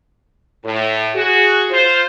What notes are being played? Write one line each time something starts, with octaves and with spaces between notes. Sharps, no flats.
A2
F#4 G#4
F4 C5